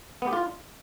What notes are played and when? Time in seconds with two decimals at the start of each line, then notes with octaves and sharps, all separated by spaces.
0.22 B3
0.27 G4
0.33 F4